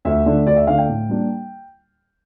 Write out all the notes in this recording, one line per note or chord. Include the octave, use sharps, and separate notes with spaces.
D2 E5
D3 A3 D4
D2 D5
E5
D3 A3 D4 F5
G5
A2
G3 A#3 D4